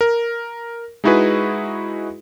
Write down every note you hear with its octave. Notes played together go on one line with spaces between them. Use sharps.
A#4
G#3 D#4 E4 F#4 G#4 B4